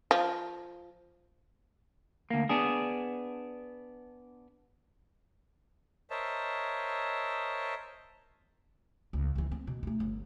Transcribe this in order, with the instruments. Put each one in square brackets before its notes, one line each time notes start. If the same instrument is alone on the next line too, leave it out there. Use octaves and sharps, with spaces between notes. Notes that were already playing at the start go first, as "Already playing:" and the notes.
[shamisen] F3
[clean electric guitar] D2 A#3
B3 D4 G#4
[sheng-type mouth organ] A#4 C5 C#5 D#5 E5 A5
[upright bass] C#2
C#2 E3
C4
B2
A3 D#4
G1